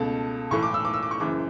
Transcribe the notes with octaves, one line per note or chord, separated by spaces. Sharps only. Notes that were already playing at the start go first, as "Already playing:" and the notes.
Already playing: C#2 B2 A3 A5
B1 A2 E3 A3 C#6
D6
E6
D6
E6
D6
C#6
F#1 F#2 E3 G#3 D6